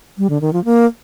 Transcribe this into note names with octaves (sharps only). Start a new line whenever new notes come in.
G3
D3
D#3
F3
A#3